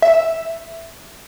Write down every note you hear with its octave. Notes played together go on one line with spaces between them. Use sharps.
E5